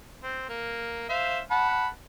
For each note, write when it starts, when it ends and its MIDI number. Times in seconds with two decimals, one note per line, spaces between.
0.23 0.45 60
0.49 1.08 58
1.09 1.40 72
1.09 1.40 76
1.09 1.40 77
1.51 1.88 78
1.51 1.88 81
1.51 1.88 83